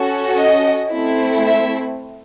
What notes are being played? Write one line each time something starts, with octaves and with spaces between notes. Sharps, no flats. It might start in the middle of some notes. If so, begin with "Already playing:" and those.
Already playing: C#4 F#4 A4
D#5
A3 C4 E4
E5